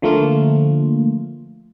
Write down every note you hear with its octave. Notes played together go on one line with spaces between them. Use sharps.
D3 F3 A3 A#3 F4